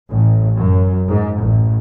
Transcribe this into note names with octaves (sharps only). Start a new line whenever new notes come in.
A1
F#2
G#2
A1